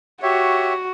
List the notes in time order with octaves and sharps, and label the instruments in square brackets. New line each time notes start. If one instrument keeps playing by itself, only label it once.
[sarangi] F#4 [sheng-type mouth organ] G4 C#5 E5